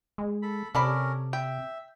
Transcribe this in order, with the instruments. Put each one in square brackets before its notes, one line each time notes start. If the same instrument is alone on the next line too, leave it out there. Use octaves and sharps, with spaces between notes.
[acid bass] G#3
[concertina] A4 B5
[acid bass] C3 [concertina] C#4 A#4 [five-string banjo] A4 D5 B5
[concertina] E5 [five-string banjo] G5